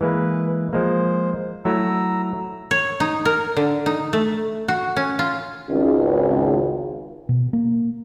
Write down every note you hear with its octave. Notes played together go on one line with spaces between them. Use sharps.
E3 G#3 A#3 B4
F3 G#3 A#3 C5
F#3 A3 E4 A#5 E6
C#5
D#4
A#4
D3
D#4
A3
F#4
C#4
F4
G#1 C#2
B2
A#3